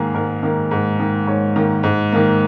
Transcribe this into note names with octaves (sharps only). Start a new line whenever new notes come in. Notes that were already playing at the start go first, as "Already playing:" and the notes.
Already playing: G#2 D#3 A#3 G#4
G#2 A#4
D#3 A#3
G#2
D#3 A#3
G#2 C#5
D#3 A#3
G#2
D#3 A#3